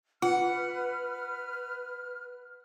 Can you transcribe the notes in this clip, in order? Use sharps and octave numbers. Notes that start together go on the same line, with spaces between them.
F4 B4 F#5 F6